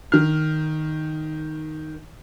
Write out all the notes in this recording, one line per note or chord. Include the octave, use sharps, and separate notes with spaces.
D#3 F6